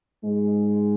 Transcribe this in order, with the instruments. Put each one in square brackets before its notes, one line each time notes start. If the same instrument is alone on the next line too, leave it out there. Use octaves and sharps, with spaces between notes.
[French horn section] G#2 G#3